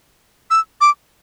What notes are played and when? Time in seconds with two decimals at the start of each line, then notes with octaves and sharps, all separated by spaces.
0.51 E6
0.81 D6